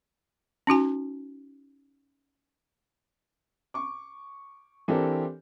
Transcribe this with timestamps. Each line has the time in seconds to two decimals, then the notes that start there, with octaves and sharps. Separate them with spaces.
0.67 C#4 D#4 F#4 G#5
3.74 C#6 D6
4.88 E3 C4 D4 G4 A4 A#4